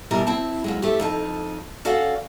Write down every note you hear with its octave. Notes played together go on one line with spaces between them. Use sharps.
B2 E3 G3 G4 A#4
C4 E4 A5
F2 F#3 G#3
A3 C4 G4
F2 D#4 A5
C#4 F#4 A4 D5 F5 F#5